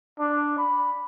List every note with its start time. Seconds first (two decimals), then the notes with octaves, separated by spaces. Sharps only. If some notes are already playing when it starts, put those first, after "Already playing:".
0.20 D4
0.58 B5